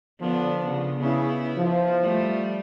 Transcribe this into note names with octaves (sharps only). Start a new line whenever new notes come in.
D3 F3 B3 D4
C#3
C#3 B3 E4
F3
G3 A3